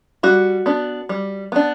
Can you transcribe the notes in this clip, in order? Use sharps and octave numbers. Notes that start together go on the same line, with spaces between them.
G3 F#4
B3 D4
G3
B3 D4